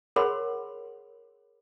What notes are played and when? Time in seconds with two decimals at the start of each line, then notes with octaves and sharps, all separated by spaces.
0.16 G#4 A#4 C#5 F#5 B5 C6